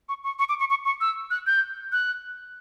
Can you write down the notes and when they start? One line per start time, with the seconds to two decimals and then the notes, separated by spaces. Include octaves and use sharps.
0.09 C#6
0.24 C#6
0.39 C#6
0.49 D6
0.59 C#6
0.70 C#6
0.85 C#6
1.01 E6
1.31 F#6
1.47 G6
1.92 F#6